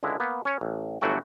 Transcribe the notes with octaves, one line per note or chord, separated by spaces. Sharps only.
C#2 D3 G#3 E4
A#3 B3
C#4 C#5
A1
G1 E3 F#3 A3 F#4 G5